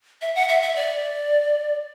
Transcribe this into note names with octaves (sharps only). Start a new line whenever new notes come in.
E5
F#5
E5
E5
D5